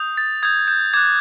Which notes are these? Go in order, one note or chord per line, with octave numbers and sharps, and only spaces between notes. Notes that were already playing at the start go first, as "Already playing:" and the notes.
Already playing: D#6 G6
A6
D#6 G6 G#6
G6
D6 F#6 G#6